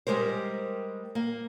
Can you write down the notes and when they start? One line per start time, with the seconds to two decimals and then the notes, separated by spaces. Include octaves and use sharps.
0.07 G3 G#3 G4 A#4 C5
1.15 A#3